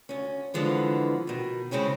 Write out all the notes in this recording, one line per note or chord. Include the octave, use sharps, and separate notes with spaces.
D2 C#4
D3 E3 F3 G#3 B3
B2 D#3
C#3 G#3 C4 C#4 E4